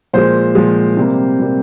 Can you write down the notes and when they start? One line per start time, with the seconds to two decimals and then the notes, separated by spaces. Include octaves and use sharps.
0.14 A#2 F3 G#3 C5
0.55 A#2 F3 G#3
0.97 C3 G3 A#3
1.40 C3 G3 A#3